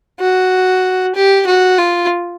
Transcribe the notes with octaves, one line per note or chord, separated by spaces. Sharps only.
F#4
G4
F#4
F4